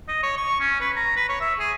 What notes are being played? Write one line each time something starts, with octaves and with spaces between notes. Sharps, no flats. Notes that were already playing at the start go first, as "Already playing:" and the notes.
D#5
C#5
C#6
C#4
B4
A#5
B4
C#5
E5
G#4